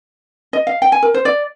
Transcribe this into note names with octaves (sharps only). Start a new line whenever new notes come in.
D#5
F5
G5
G#5
A#4
C5
D5